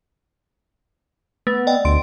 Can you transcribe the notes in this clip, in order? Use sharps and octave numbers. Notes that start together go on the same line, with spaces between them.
A3 B3
D5 D#5 G5
D2 C6 D7